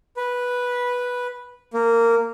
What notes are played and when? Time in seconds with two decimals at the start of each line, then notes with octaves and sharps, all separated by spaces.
0.17 B4
1.73 A#3